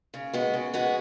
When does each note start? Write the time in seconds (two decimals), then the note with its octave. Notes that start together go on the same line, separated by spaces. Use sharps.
0.14 C#3
0.33 G#3 B3 F#4
0.54 C#3
0.74 G#3 B3 F#4